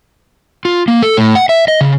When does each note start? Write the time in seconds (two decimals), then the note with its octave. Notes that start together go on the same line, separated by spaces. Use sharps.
0.65 F4
0.88 A#3
1.02 A4
1.17 A2
1.35 F#5
1.49 E5
1.68 D#5
1.81 C#3